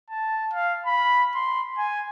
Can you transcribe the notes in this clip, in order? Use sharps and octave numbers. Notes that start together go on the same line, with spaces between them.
A5
F5
B5
C6
G#5